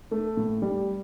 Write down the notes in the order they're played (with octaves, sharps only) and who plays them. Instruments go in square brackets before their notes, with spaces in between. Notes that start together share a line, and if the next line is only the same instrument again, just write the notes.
[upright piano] A3
A2
G3